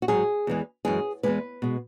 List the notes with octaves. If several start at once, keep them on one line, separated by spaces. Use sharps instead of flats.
F#4
G#2 F#3 G#4
E2 E3 G#3
F#2 E3 G#3 G#4
E2 B2 G#3 B4
B2 G#3